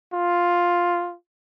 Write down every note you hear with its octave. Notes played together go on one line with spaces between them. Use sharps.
F4